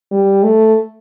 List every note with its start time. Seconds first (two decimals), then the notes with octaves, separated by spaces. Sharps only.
0.11 G3
0.44 A3